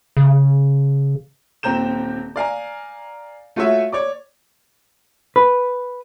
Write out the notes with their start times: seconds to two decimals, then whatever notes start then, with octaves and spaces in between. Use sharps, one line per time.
0.17 C#3
1.63 D#1 A#2 C4 A#5 G6 E7
2.36 D5 F5 G#5 A#5
3.56 A3 F4 F#4 C#5 E5
3.92 C#5 D5 D6
5.36 B4